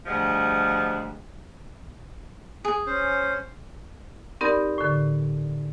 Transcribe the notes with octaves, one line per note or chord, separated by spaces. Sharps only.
D2 F3 G3 G#3 F#5
G#4
C#4 C5
C4 D#4 G4 A#4 D5 B5
A2 D3